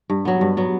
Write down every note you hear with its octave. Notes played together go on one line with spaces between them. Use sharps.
G2
F#3 B3
G2
F#3 B3